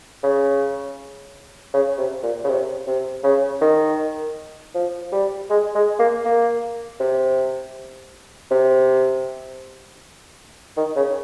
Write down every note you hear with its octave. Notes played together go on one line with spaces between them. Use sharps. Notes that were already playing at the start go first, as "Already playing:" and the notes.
C#3
C#3
C3
A#2
C#3
C3
C3
C#3
D#3
F3
G3
G#3
G#3
A#3
A#3
C3
C3
D#3
C#3